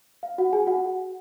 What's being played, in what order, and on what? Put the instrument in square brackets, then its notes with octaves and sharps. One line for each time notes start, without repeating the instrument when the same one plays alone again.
[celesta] F5
F#4 F#5
G#4 G#5
F#4 F#5